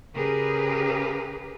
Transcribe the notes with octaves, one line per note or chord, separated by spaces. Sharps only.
C#3 G4 G#4 A#4 B4